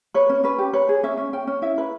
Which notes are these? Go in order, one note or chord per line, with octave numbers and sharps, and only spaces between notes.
B4 C#5
C#4
C#4 B4
G4
B4 C#5
G#4
C#4 E5
C#4
C#4 G5
C#4
E4 E5
B4